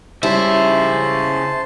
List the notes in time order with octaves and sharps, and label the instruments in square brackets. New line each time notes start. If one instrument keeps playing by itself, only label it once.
[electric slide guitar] C#3 E5 [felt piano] G3 C#4 [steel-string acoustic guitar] E4 [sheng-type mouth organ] C5 A5